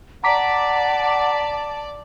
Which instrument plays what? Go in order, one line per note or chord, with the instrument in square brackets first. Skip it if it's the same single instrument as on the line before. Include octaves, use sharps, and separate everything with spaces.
[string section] D5 [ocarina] F#5 [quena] A5 [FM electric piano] A#5 D6 B6